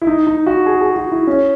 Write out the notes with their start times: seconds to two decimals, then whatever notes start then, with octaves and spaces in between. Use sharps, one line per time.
0.02 E4
0.07 D#4
0.27 D#4
0.46 F#4
0.66 G#4
0.81 G#4
0.96 F#4
1.12 E4
1.27 C#4